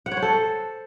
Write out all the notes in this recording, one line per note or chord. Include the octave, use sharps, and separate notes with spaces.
F#5
C#5
C5
A4